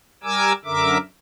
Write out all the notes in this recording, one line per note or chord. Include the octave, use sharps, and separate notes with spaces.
G3 A#4 G#5 D6 E6
F#2 D3 A#4 E5 D6